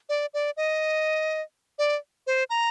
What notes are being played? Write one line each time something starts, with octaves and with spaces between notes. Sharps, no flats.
D5
D5
D#5
D5
C5
A#5